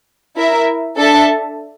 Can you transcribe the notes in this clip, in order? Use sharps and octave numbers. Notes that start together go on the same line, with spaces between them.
E4 A#4 E5
D4 A4 E5 A5